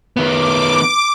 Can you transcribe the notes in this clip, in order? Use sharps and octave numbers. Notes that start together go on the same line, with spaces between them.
D#3 B3 D6